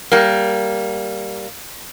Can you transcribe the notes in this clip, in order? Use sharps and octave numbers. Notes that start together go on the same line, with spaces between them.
G3 A#3